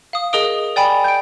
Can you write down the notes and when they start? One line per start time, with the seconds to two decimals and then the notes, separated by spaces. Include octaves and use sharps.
0.13 F5 D#6
0.33 G#4 A#4 D#5 D#6 D7
0.76 D5 G5 G#5 B5
1.04 G6 D7